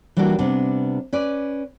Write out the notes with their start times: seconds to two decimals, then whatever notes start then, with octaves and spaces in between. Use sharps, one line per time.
0.17 E3 G3 A#3 D4 F#4
0.39 C3 G3 B3 D4
1.13 C#4 B4 D5